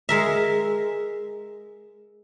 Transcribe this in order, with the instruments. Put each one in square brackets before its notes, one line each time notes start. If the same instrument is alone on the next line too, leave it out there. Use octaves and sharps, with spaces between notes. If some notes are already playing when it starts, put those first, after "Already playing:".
[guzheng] G#3 A#4 E5